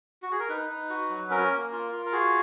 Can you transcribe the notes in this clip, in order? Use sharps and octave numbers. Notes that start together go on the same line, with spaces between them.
F#4
G#4
A#4
D#4 B4
D#4
F#4
F#3
C#4 A#4
A#3
F4
F4
A#4
F#4 G#4